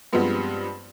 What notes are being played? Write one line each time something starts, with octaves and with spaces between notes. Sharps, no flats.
G2 F3 G3 G#3 B3 C4